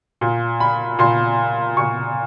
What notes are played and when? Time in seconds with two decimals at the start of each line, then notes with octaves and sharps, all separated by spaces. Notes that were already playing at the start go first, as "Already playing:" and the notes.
0.21 A#2
0.60 B5
0.99 A#2 C6
1.77 A#2 C#6